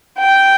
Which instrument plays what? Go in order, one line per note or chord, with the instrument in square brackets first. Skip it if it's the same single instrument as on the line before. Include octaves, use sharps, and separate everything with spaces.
[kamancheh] G5